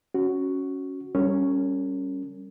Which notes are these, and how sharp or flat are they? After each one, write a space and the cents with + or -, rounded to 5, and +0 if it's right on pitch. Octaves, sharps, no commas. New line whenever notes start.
C#4 +0 F#4 +0
G3 +0 C#4 +0 A#4 -40